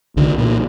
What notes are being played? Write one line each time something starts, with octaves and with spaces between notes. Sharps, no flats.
C2 D3
A#2